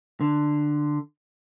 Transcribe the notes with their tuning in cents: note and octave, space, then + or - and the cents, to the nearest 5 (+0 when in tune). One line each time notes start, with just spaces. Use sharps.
D3 +15